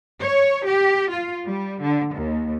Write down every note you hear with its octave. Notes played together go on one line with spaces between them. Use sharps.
C#5
G4
F4
G3
D3
D#2